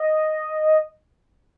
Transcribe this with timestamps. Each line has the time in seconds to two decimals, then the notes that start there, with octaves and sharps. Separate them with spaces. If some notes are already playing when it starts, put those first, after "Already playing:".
Already playing: D#5